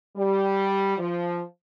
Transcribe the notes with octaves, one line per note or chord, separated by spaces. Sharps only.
G3
F3